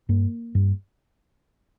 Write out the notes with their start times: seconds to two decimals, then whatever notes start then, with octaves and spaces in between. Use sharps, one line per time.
0.09 G2 A#3
0.55 G2